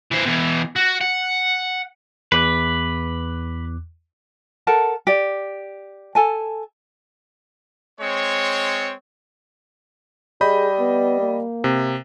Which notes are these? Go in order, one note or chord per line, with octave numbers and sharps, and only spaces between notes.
E3 C5
B2 E3
F#4
F#5
E2 B4 D6 F#6
A4 A#4 F#5 A5
G4 D5
A4 G#5 A5
G#3 C4 C#5
G3 G#4 D#5 B5 G6
B3
A#3
C3